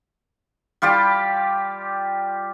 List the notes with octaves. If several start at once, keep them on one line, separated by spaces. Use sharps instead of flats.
G3 F4 G4 D5